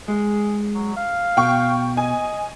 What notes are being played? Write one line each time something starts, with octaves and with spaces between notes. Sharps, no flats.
G#3 G#4
F#3
F5
B2 G5 C#6
D#5 G#5